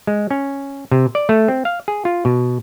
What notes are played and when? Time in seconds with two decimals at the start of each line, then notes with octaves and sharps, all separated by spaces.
0.07 G#3
0.30 C#4
0.91 C3
1.15 D5
1.29 A3
1.48 C4
1.65 F5
1.88 G#4
2.05 F4
2.25 B2